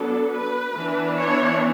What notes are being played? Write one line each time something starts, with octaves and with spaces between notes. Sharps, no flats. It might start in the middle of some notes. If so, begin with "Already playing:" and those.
Already playing: F#3 B3 D4 A4
B4
E3 B3 D4
C#5